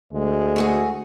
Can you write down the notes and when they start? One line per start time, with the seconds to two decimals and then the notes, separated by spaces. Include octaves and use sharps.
0.13 D2 G#3
0.56 A3 F#4 G#4